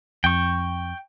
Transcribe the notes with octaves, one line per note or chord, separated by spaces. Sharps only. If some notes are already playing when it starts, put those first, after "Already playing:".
F2 G5 C#6